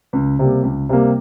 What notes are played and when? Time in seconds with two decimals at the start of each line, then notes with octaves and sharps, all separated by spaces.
0.13 C#2
0.39 C3 G3 A#3
0.63 C#2
0.89 C3 G3 A#3